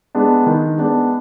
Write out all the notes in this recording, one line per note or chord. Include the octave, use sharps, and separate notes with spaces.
G#3 B3 D4
D#3
G#3 B3 D4